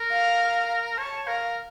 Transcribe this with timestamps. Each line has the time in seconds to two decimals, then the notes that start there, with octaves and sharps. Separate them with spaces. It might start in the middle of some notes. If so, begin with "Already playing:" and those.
Already playing: A#4
0.12 F5
0.98 C#5 A5
1.27 A#4 F5